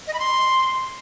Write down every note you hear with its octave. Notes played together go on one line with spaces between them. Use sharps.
D#5
B5
C6